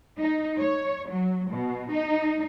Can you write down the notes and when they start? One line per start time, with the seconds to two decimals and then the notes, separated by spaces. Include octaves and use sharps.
0.18 D#4
0.59 C#5
1.09 F#3
1.50 B2
1.92 D#4